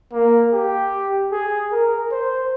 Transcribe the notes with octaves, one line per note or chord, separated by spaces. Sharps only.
A#3
G4
G#4
A#4
C5